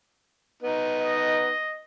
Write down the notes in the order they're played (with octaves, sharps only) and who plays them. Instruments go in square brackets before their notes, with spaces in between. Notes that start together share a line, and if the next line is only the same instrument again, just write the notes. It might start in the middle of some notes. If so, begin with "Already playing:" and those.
[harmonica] B3 D#4
[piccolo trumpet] D#5